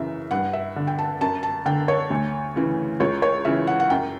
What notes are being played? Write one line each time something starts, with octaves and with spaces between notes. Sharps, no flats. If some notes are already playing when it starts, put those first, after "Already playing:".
Already playing: F#2 C#3 E3 E5
G2 F#5
E5
D3
G5
A5
F#2 A5
A5
D3 G5
C#5
D2
C#3 E3
C#2 C#5
C#5
C#3 E3 E5
F#5
F#5
F#2 G5